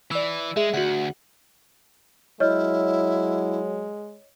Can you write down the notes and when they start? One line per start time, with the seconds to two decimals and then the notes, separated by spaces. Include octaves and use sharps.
0.11 E3 D5 E6
0.57 G#3 G#4 E5
0.74 D2 F#4 F#5
2.40 F#3 G#3 E4 C#5 D#5 F6